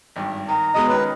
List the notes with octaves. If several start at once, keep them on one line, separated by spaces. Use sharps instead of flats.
G#1 G2
D#3 A#5
B2 G#3 B3 D#5
D#3 C#4 B4